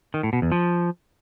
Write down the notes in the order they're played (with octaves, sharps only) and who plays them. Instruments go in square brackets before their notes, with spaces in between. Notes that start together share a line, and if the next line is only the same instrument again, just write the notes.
[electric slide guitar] D#3
A2
B2
E2
F3